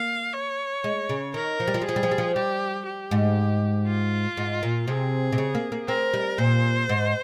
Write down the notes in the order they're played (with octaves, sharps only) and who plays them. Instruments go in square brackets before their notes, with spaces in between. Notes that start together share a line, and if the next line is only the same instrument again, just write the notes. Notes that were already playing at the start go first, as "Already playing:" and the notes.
Already playing: [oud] A#3 [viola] F5
[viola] C#5
[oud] G#3
C#3
[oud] D#3 [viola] A#4
[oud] F3
G3
F3
G3
[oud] F3 [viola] G#4
[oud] G3
F3
G3
F3
[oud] G3 [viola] G4
[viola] G4
[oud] G#2
[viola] F4
[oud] G#2
A#2
[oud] C3 [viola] G#4
[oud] C3
C#3
A#3
A#3
[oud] C4 [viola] A#4
[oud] G3
[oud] A#2 [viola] C5
[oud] G#2